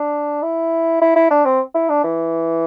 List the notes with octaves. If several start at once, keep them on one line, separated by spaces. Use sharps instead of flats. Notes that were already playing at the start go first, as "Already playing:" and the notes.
Already playing: D4
E4
E4
E4
D4
C4
E4
D4
E3